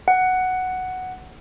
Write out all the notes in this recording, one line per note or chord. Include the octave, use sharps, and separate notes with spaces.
F#5